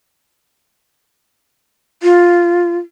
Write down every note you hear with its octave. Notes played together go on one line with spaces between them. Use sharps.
F4